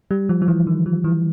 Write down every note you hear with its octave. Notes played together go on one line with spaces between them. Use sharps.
G3
F3
F3
E3
D#3
F3
E3